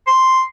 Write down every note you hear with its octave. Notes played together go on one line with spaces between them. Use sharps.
C6